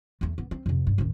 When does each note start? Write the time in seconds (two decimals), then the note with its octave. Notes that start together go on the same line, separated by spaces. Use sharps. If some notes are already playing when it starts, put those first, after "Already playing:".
0.21 E2 A3
0.38 B3
0.51 C4
0.66 F2 C3
0.87 G2
0.98 A1 D#2